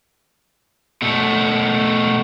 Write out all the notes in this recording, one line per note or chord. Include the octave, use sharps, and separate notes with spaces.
B2 A3